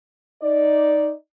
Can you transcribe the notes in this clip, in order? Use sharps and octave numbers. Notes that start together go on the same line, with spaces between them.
D#4 D5